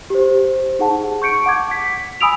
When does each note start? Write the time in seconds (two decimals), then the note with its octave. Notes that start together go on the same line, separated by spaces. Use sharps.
0.10 G4 C5
0.79 D#4 G#4 F#5 A5
1.22 C#6 G6 C#7 D7
1.46 F#5 D6 G#6
1.71 B6
2.21 G#5 B5 D#6 E6 D7 F7